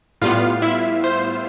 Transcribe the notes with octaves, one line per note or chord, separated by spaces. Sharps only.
A2 G3 B3 F4 F5
E4 E5
C5